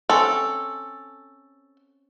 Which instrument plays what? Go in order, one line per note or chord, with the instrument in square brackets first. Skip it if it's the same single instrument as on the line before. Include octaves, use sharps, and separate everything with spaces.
[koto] C4 C#4 [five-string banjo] A4